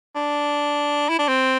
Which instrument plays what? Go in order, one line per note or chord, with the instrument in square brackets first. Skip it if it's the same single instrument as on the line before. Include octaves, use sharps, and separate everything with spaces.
[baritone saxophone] D4
E4
D4
C4